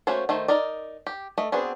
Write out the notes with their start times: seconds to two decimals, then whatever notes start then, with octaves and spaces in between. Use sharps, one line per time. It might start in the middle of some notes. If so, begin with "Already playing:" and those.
0.07 A3 A#3 C#4 F#4 C5
0.29 D#3 A3 C5
0.48 D#4 A#4 D5
1.07 G4
1.38 A3 D#5
1.52 B3 C4 D4 F#4 G#4